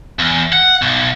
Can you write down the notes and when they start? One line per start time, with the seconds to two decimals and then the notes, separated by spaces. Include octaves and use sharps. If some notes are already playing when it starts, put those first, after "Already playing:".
0.19 E2
0.53 F#5
0.82 B1